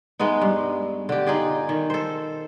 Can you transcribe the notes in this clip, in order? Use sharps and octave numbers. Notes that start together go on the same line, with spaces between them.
G#3 A3 B3 D#4
G2
D3 G4
D#4 F4 G#4 D5
D#3
A4 C5